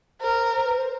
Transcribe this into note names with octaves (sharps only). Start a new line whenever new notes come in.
A#4 C5
C5
B4
C5